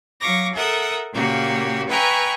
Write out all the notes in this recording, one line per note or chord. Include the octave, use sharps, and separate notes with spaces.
F#3 F5 C#6 D6 A#6
A4 A#4 E5 F#5 D#6
A#2 C#3 A#3 F#4 G4
B4 E5 G5 G#5 A#5 C#6